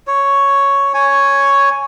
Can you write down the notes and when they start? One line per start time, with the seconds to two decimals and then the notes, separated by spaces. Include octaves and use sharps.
0.07 C#5
0.94 C#5 G#5